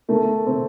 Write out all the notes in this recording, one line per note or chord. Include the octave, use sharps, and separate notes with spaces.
A3 A#4
C4